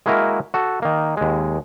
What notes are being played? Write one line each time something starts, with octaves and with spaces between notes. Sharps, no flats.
G#3 A#3 E4 F#4 A#4
F#4 A4
D#3 A#3
D#2 G#3